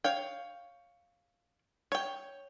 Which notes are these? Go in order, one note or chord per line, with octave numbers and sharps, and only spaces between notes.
C#5 F5 G5
C#5 G5